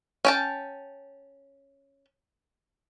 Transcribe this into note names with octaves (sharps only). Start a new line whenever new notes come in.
C#4 G5 A5